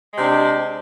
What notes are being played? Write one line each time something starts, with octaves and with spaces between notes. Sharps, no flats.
C3 G#3 D4